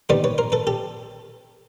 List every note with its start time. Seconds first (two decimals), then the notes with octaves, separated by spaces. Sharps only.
0.09 D#2 D#3 G3 B3 C5 D5
0.24 B4 C#5
0.38 A#4 C5
0.52 A4 B4
0.67 G4 A4